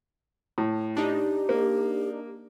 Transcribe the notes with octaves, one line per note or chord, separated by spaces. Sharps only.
A2
D4 D#4 G4
A#3